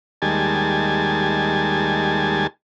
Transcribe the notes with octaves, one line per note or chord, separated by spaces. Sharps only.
D#2 G3 G#3 G#5 A5